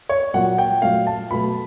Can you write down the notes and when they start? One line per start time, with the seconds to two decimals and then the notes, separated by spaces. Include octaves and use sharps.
0.09 C#5
0.34 A#2 F#3 A#3 F#5
0.58 G5
0.82 A#2 F#3 A3 F5
1.07 A5
1.31 B2 F#3 A3 B5